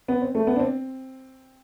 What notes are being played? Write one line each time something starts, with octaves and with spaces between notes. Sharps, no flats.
B3
C4
A3
B3
D4
C4